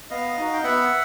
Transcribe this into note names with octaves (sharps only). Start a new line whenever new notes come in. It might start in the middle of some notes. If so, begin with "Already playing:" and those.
B3 D#5 F5
D#4 F#4
G5
B3 E5 F#5